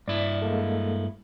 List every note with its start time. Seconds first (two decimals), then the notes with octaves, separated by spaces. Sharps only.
0.08 G2 E4 D5
0.42 G#3 A#3 A4